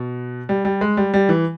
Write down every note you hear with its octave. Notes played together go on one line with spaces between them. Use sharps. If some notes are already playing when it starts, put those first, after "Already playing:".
Already playing: B2
G3
G3
G#3
G3
G3
E3